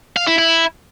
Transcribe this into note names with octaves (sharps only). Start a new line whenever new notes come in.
F5
E4
E4